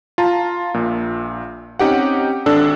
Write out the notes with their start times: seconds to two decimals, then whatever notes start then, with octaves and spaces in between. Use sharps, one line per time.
0.18 F4 A5 A#5
0.74 A#1 A#2
1.79 C4 C#4 D#4 G4 F#5
2.46 G#1 D4 A4 E6